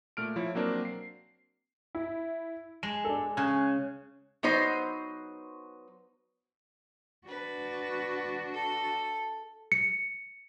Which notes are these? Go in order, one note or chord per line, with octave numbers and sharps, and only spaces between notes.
A#2 A3 F6 D7
F3 E4 C#5
F#3 A#3 C4 D4 A#4
C7
E4
G#3 E7
D4 A4
C#3 G#5 F#6 G#6
F#3 B3 D#4 C5
D4 F#4 B4
A4
C#7